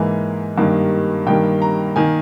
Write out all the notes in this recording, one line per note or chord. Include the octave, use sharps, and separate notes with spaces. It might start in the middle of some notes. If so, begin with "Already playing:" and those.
Already playing: G#2 E3 A#3 G#5
G2 D#3 A#3
G2 D#3 G3 A#3 G5
A#5
D#3 A#3 G#5